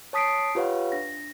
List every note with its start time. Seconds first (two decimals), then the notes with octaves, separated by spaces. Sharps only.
0.13 C#5 A5 D#6 B6 C7 D7
0.55 F4 G4 B4 C#5 F5 F#5
0.92 D4 A#6